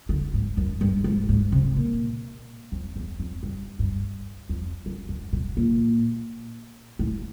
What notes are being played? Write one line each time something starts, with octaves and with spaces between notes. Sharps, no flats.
D3
G#2
F#2
G2
G#2
G#2
C3
A#2
F2
E2
F2
G2
G2
F2
F#2
F#2
B2
A#2
A2